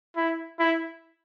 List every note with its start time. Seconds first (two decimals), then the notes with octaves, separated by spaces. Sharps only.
0.17 E4
0.59 E4